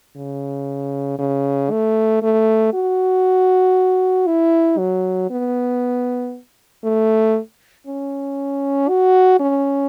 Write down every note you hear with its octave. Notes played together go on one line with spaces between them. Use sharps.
C#3
C#3
A3
A3
F#4
E4
F#3
B3
A3
C#4
F#4
C#4